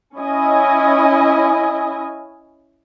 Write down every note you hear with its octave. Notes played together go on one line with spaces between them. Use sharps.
C#4 E4 D#5 G#5